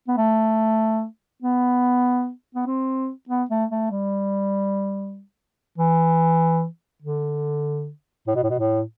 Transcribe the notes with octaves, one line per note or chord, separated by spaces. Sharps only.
B3
A3
B3
B3
C4
B3
A3
A3
G3
E3
D3
A2
B2
A2
B2
A2